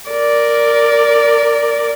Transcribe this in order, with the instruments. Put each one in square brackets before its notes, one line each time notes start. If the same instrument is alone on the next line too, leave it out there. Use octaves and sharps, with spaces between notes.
[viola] A#4 D5